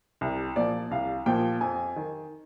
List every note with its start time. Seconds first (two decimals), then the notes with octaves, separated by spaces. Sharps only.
0.21 C2
0.56 A#2 F3 D5
0.91 C2 F5
1.26 A#2 F3 G5
1.61 F2 G#5
1.96 D#3